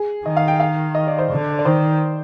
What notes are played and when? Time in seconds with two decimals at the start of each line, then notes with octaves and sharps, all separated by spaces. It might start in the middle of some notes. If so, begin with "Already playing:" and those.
Already playing: G#4
0.26 D#3 D#5
0.37 F5
0.48 G5
0.60 F5
0.95 D#5
1.07 D5
1.19 C5
1.31 D3
1.59 D5
1.65 D#3 C5